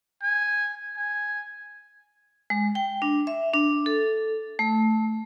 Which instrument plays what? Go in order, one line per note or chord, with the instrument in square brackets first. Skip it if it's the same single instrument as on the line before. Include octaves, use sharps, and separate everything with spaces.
[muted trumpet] G#5
G#5
[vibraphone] G#3
G5
D4
E5
D4
A4
A3